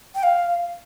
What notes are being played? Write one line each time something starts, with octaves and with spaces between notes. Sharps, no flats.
G5
F5